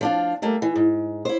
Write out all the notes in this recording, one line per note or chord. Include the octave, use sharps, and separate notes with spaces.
F3 D4 F4
G3 A3 A#3
E3
G#2
E4 C5